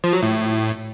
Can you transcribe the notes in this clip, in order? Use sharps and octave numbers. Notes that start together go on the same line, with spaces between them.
F3
F#3
A2